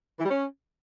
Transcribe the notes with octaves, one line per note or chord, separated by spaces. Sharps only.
E3
G3
C#4